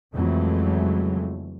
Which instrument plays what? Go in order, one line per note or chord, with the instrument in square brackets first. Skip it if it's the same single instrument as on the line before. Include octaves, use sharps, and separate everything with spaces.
[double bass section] F2 C#3 E3 F#3 G#3 A3